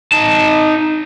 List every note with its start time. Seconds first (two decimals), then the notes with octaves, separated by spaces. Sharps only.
0.13 D#4 A5